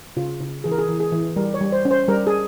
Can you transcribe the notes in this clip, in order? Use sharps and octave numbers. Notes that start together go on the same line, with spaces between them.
C#3 F4
C#3
E3 G#4
A#4
G#4
E3
G#4
E3
G3 A#4
C#5
G3
C5
C#4
C5
G3 A#4
G#4